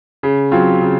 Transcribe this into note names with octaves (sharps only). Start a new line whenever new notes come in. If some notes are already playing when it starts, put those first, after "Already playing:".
C#3
F#3 C4 F4
C#3